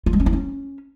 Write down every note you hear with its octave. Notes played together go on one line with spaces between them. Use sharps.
F4
G#3
C#4
E4
C#4